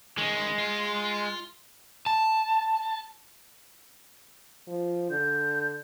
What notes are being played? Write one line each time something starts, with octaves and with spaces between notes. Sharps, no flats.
D#3 G#3 C#4
F4
A5
F3
D3 G6